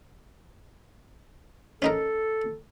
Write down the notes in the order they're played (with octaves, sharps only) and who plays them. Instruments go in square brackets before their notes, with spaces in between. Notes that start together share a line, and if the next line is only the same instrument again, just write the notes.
[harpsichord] C#4 D#4 A#4 [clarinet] A4